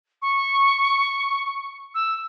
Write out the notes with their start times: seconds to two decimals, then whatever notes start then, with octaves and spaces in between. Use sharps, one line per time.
0.21 C#6
1.94 E6